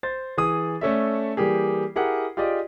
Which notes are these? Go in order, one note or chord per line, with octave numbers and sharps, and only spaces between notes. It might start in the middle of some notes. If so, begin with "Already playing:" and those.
C5 A6
E3 G#4 D#6
A3 C#4 A4 D5 E5
E3 G3 A#3 G4 G#4
E4 G4 G#4 A#4 F#5
F4 G4 G#4 D5 D#5